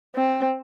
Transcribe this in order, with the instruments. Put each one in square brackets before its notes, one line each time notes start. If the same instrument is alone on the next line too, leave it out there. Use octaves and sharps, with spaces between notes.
[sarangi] C4